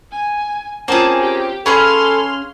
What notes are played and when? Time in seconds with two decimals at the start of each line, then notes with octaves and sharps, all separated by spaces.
0.12 G#5
0.88 A#3 C4 C#4 F4 G#4 A5
1.20 G4
1.66 C#4 G#4 A4 B4 F5 B5 C6 F6